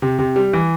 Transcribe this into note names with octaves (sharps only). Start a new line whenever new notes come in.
C3
C3
G3
E3